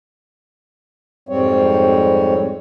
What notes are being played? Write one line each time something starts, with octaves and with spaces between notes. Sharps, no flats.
F2 G#2 G3 C4 C#5